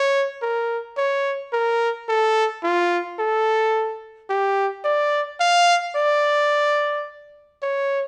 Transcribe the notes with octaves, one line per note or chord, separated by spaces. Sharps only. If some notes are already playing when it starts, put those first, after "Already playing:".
Already playing: C#5
A#4
C#5
A#4
A4
F4
A4
G4
D5
F5
D5
C#5